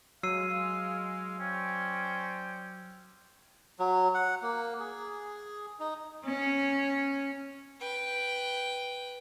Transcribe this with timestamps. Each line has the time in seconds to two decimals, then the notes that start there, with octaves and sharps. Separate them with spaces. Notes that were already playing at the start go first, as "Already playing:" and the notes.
0.23 F#3 G#3 F5 E6 C7 D#7
1.40 C#4 C5 D5 G5
3.79 F#3
4.14 F#5
4.42 A#3
4.80 G#4
5.79 D#4
6.25 C#4
7.80 B4 G5